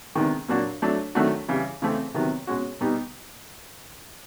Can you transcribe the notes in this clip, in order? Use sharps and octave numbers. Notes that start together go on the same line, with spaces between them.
C3 D#3 G#3 B3 D4
A#2 F#3 A#3 D4 F#4
F#3 A3 D4
D#3 F#3 A3 D4 F#4
C#3 E3 G3
C#3 E3 A3 C4
C3 D#3 F#3 B3
B2 G#3 C#4 F#4
B2 G3 B3 D#4 G4